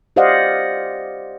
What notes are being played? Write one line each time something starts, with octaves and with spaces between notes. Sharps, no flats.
G4 C5 D5 D#5 F5 F#5